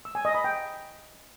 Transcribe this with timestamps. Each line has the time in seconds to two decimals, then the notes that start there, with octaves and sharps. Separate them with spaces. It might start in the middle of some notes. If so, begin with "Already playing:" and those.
0.05 E6
0.15 G#5
0.25 D#5
0.35 B5
0.44 G5